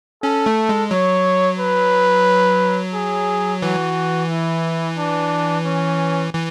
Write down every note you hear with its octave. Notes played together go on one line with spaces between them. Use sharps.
C#4 A4
A3
G#3
F#3 C#5
B4
G#4
E3 F#4
E4
D4
C#4
E3